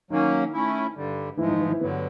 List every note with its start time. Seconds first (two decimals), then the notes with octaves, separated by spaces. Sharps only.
0.10 D#3 F#3 A#3 C#4 D#4
0.53 A3 C#4 E4
0.96 G2 D3 G3
1.37 G#2 E3 F3 G#3 E4
1.48 D#3 D#4
1.59 E3 E4
1.69 E3 E4
1.81 G2 D3 F#3 B3